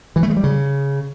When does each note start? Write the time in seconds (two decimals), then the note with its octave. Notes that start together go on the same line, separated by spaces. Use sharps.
0.16 E3
0.23 A3
0.30 G#3
0.37 G3
0.44 C#3